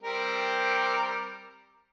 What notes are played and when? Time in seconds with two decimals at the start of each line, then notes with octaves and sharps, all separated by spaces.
0.03 G3 C4 A#4